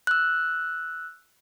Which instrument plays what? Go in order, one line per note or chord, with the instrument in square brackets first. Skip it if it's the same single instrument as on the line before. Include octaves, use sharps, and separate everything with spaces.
[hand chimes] E6 F#6